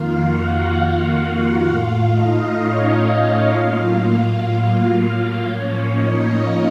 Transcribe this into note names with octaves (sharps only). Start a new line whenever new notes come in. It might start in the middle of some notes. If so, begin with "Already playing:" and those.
Already playing: F2 D#3 A#3 F4 F5
F#4 F#5
A2 A3 F4 F5
D#4 D#5
C#4 C#5
C#4 C#5
A2 F#3 A#3 F4 F5
A2 F3 A#3 C#4 C#5
D#4 D#5
F4 F5